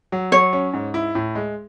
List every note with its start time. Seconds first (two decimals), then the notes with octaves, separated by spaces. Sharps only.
0.12 F#3
0.32 F#3 C#5
0.53 C#4
0.74 G#2
0.94 E4
1.15 A2
1.35 G#3